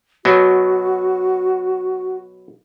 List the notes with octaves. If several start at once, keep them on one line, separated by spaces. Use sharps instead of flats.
B2 F#3 F#4